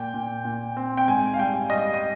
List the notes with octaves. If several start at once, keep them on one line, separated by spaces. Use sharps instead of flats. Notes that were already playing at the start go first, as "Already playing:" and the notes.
Already playing: A#2 G5
A#2
A#2
C4
G5
G#2 G#5
F5
G3 G5
G3 D#5
D#5